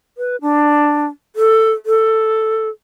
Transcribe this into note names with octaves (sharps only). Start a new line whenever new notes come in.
B4
D4
A4
A4